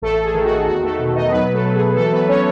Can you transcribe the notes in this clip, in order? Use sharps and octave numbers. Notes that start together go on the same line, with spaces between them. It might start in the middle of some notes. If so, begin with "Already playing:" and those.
A1 A3 A4
G#4
D#3
F#4
E2 F#4
A3 A4
B2
D#4 D#5
F#3 B3 B4
A3 A4
F#3
G#4
E3 A3 A4
B3 B4
C#4 C#5